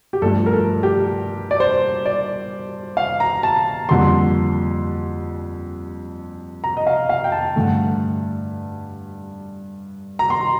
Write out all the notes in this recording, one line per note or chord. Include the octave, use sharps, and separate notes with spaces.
G4
G2 F3 A3 A4
A#4
A4
G4
D5
C5
D5
F5
A#5
A5
F2 D3 G3 A#3 C6
A#5
D#5
F5
F5
G5
A5
G2 D3 A3
A#5
C6